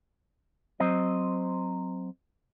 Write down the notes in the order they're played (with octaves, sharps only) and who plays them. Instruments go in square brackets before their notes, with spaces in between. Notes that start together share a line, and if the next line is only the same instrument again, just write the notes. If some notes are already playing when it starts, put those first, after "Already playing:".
[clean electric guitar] F#3 C4 C5 D#5